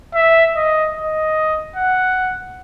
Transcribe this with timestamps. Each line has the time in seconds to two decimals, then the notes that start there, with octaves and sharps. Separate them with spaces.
0.15 E5
0.56 D#5
0.97 D#5
1.76 F#5